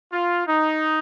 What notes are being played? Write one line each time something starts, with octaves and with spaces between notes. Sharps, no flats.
F4
D#4